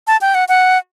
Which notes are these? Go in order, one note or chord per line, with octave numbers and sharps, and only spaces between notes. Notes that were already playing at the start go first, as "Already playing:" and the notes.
A5
G5
F#5
F#5